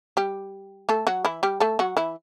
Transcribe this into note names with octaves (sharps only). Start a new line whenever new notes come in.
G3 G4
A3 A4
F#3 F#4
E3 E4
G3 G4
A3 A4
F#3 F#4
E3 E4